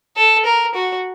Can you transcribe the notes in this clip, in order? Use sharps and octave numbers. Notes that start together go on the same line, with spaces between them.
A4
A#4
F#4